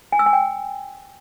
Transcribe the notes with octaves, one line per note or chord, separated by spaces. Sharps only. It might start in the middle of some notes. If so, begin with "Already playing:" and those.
G#5
E6
G#5
G5